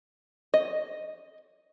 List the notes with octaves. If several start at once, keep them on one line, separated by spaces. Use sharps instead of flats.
D#5